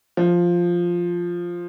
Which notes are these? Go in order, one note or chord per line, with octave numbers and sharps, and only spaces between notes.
F3